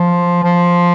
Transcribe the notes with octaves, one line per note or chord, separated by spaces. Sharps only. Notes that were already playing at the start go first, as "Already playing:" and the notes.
Already playing: F3
F3